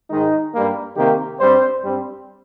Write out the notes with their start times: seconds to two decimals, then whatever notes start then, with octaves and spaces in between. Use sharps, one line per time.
0.10 G#2 D#3 G#3 D#4
0.53 G2 G3 A#3
0.96 C3 D#3 A#3 G4
1.39 G2 G3 C4 C5
1.82 G2 G3 C4